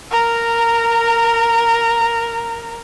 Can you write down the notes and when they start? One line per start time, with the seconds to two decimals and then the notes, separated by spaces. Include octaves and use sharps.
0.11 A#4 A#5